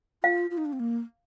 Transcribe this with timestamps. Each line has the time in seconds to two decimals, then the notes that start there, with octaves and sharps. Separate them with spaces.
0.23 F4 F5
0.50 F4
0.58 D#4
0.65 D4
0.73 C4
0.80 A#3